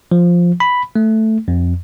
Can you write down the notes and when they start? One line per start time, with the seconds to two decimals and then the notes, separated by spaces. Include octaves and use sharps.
0.12 F3
0.60 B5
0.96 A3
1.48 F2